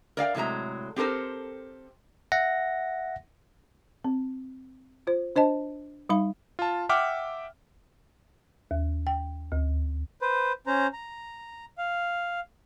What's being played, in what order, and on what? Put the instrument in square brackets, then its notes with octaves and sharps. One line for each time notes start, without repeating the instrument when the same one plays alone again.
[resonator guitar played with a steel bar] A#4 D5 F5 G5
A2 C3 F#3 G#3 A#5
C4 G4 A4 A#4 C5
[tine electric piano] E5 F#5 A#6
[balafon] C4
F4 C5
D4 C5 D#5 A5
G3 D#4 F5 B5
[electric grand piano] F4 A5
E5 F#5 G5 D6 F6
[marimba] D#2
G5
D2
[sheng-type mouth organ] B4 C5
C#4 C5 A#5
A#5
F5